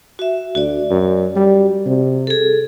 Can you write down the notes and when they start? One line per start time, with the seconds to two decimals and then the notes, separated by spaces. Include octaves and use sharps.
0.19 F#4 E5
0.55 D2 F#4 D5
0.90 F#2
1.36 G3
1.86 C3
2.27 G#4 A4